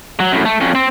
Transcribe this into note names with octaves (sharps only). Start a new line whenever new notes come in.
F#3
F#2 A2
A3
F2 C#4
C4